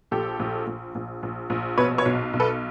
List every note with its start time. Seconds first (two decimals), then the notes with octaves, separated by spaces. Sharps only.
0.11 A#1 G4 A4
0.39 A#1
0.67 A#1
0.95 A#1
1.23 A#1
1.50 A#1
1.77 B2 B4 C#5
1.98 B4 C#5
2.05 B1
2.33 B1
2.40 A4 B4